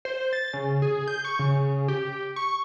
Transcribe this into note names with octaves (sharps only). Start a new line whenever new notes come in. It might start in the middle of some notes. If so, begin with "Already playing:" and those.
C5
A6
C#3
G#4
G6
C#6
C#3
G4
C#6